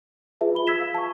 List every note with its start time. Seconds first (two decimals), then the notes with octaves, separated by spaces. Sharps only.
0.41 F4 G#4 B4 E5 A5
0.54 F4 B5 G7
0.67 E6 G#6 B6 E7
0.80 F5
0.94 A5 C#6